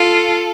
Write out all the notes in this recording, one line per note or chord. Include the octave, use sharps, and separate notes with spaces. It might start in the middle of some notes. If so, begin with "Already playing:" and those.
Already playing: F4 A4